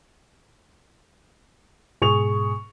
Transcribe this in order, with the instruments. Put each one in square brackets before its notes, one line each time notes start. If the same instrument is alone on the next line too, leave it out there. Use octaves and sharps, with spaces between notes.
[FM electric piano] G#2 B2 [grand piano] G#4 C#6 F7